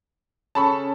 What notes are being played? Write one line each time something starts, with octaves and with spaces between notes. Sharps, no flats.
C#3 A4 A5 B5 C#6